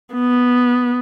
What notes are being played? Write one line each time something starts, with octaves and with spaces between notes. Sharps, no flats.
B3